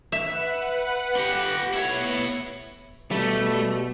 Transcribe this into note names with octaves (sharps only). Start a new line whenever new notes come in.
B4 E5 F#5 F#6
G4 F#5
B3 E4 C#5 D7
B2 G3 A3